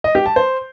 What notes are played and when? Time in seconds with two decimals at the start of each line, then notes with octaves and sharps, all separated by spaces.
0.04 D#5
0.15 G4
0.26 A5
0.36 C5